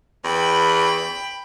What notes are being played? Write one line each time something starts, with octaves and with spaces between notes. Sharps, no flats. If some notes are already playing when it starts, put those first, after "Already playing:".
E2 G5 B5